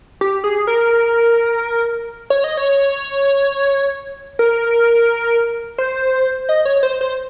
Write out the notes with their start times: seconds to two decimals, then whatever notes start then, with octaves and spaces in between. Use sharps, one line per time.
0.21 G4
0.44 G#4
0.67 A#4
2.30 C#5
2.44 D#5
2.57 C#5
4.39 A#4
5.78 C5
6.49 D#5
6.65 C#5
6.83 C5
7.01 C5